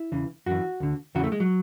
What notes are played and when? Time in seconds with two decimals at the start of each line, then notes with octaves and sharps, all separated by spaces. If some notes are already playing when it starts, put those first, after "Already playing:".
Already playing: E4
0.12 E2 C#3 E3
0.46 F#2 E3 F#4
0.80 D2 D3
1.15 E2 C#3 E3 F#4
1.23 A3
1.32 G#3
1.40 F#3